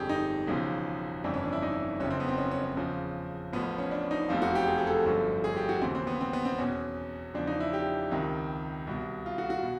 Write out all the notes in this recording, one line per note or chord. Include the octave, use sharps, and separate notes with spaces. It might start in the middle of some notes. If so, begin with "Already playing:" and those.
Already playing: G1 F2 D3 G4 G#4
D#4
E1 E2 C#3 F3
G1 F2 C#3 E3 D4
C#4
D4
E4
D#4
F#1 F2 C#3 C#4
C4
B3
C4
C#4
C#4
C#4
E2 C#3 F3
A1 A2 F3 B3
C#4
D4
D#4
F1 E2 C3 F3 F4
F#4
G4
G#4
G#4
A4
G1 F#2 D3 F3
G#4
G4
F#4
D#2 C#3 E3 C4
C4
B3
C4
B3
C4
E2 B2 C#4
E2 C#3 F3 D4
D#4
E4
G4
C#2 C3 D#3
C2 B2
F4
F#4
F#4
B2